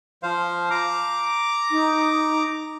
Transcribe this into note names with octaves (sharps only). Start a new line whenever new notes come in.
F3 C5 F5
A#5 D6
D#4